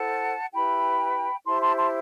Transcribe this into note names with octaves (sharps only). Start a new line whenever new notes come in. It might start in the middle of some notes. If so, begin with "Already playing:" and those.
Already playing: E4 A4 C5 F#5 A5
E4 G4 B4 G5 B5
E4 G4 C5 A5 C6
A5 C6
A5 C6